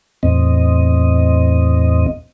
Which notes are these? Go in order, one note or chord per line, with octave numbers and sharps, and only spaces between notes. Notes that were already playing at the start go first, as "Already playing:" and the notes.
E2 A2 C4 D#5